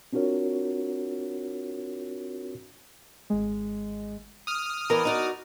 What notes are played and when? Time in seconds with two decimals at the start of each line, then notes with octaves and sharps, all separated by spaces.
0.13 C4 D4 F4 F#4 A#4 C#5
3.30 G#1 G#3
4.47 D#6 F6
4.90 E3 B3 A#4 D5
5.05 D#4 F#4 D5